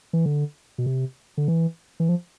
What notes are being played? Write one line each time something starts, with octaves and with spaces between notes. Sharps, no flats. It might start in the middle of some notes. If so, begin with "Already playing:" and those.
E3
D3
B2
C3
D3
E3
E3
F3